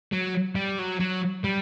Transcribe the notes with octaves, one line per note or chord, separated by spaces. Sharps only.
F#3
G3
F#3
F#3
G3